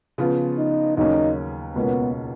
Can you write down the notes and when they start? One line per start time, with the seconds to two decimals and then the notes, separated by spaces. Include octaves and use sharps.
0.18 C#3 F3 B3 F4
0.58 D#4
0.97 D#2 C#3 F#3 A#3 C#4 D#4
1.76 C#2 B2 A#3 B3 C#4